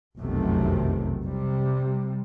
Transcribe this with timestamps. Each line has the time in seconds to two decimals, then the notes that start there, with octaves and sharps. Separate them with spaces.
0.19 F1 B1 F#2 C3 D#3 A3
1.23 C3 G3